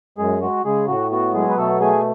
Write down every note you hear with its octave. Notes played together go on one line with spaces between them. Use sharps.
F#2 G#3 G#4
G#3 F#4
C#3 G#3 G#4
A2 F#4
B3 F#4
F#3 G#3 G#4
B4
B2 A3 A4
A3 G#4 G#5